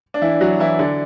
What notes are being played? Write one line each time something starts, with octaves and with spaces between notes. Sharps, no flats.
D4
E3 E4
F#3 F#4
E3 E4
D3 D4